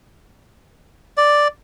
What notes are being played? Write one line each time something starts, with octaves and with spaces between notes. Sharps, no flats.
D5